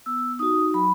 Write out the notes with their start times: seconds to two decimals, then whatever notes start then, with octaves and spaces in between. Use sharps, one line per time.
0.06 B3 E6
0.39 D#4 F#4 D#6
0.74 F#3 B5